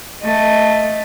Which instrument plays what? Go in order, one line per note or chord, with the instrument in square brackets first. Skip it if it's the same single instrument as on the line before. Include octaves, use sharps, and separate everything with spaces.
[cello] A3 D#5